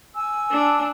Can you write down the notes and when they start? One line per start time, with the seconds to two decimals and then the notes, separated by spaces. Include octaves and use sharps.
0.14 G#5 E6
0.51 D4